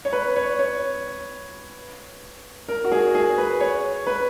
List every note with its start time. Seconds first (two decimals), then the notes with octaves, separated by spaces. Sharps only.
0.05 C#5
0.13 B4
0.36 C#5
0.59 C#5
2.68 A#4
2.84 F#4
2.92 G#4
3.15 G#4
3.38 B4
3.61 C#5
4.07 B4